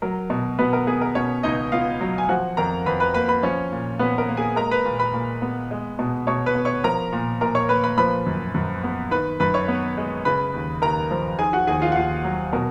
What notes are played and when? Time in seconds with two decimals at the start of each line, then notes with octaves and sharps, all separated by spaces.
0.02 F#3 A#4
0.30 B2
0.59 B2 B3 B4
0.73 A#4
0.87 B3 G#4
1.01 A#4
1.15 B2 C#4 C#5
1.43 C#2 D#4 D#5
1.72 B3 F4 F5
2.01 F#3
2.18 G#5
2.29 F3 F#4 F#5
2.57 F2 A#4 A#5
2.86 F2 B4 B5
3.00 B4 B5
3.14 A#3 B4 B5
3.28 B4 B5
3.43 F3 C#4 C#5
3.72 A#2
3.99 A#2 B3 B4
4.18 A#4
4.29 A#3
4.37 G#4 G#5
4.56 G#3 A#4 A#5
4.71 B4 B5
4.85 A#2
4.99 B4 B5
5.13 A#2
5.42 B3
5.71 G#3
5.99 B2
6.27 B2 C#5 C#6
6.46 B4 B5
6.55 B3
6.65 C#5 C#6
6.84 F3 A#4 A#5
7.12 A#2
7.41 A#2 A#4 A#5
7.55 C#5 C#6
7.69 A#3 B4 B5
7.84 B4 B5
7.98 F3 B4 B5
8.26 F#2
8.54 F#2
8.83 B3
9.11 D#3 B4 B5
9.40 F#2 B4 B5
9.54 C#5 C#6
9.68 B3
9.98 G#3
10.25 C#3 B4 B5
10.54 D#2
10.82 D#2 A#4 A#5
11.11 F3
11.39 D#3 G#4 G#5
11.53 F#4 F#5
11.67 D#2 G#4 G#5
11.82 F4 F5
11.92 F#5
11.96 D#2 F4 F5
12.24 F#3
12.53 B2 A#4